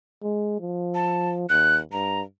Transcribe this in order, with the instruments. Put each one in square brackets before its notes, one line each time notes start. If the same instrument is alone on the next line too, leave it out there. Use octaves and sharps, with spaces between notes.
[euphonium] G#3
F3
[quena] A5
[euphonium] D#2 [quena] F#6
[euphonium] G2 [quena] A#5